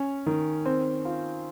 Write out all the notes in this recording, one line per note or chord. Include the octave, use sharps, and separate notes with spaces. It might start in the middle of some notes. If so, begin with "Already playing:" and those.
Already playing: C#4
D#3
C4
F4